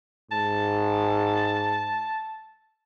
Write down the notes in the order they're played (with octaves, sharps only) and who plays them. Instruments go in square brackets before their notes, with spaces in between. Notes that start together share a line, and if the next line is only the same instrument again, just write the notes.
[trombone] G#2 [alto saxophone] A5